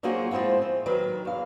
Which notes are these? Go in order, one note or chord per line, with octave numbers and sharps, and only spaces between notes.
F#3 A#3 C4 F4 F#4 G#4
F3 G#3 C4 E4 F4
C4
D#3 F#3 A#4 B4
E2 F5